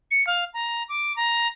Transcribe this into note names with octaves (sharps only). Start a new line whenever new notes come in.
C#7
F5
A#5
D6
A#5